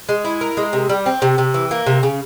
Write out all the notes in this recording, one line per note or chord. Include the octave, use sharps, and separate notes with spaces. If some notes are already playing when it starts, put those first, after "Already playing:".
G#3
E4
A#4
G#3
C3
G3
C4
C3
C3
E3
A#3
C3
C#3